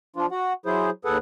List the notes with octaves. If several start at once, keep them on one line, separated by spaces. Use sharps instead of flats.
F3 D4 F4
F#4 F#5
F#3 E4 G#4 C5
D#2 G#4 A4 B4 F#5